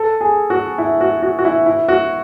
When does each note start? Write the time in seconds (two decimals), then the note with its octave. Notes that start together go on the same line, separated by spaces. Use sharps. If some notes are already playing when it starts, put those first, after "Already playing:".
Already playing: A4
0.21 G#4
0.50 F#4
0.78 E4
1.01 F#4
1.22 F#4
1.39 F#4
1.45 E4
1.66 E4
1.88 F#4